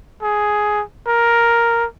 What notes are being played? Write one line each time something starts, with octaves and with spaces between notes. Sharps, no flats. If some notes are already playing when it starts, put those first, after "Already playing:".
G#4
A#4